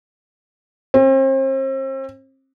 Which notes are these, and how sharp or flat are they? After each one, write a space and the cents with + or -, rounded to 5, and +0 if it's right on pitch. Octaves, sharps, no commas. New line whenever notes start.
C4 +40